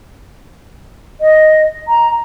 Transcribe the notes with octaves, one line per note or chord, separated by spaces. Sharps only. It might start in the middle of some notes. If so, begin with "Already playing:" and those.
D#5
A#5